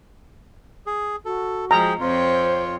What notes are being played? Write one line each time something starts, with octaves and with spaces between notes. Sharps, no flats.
G#4
F#4 A4
F3 G#3 G#4 G5 A#5
F2 C4 F4 C5 C#5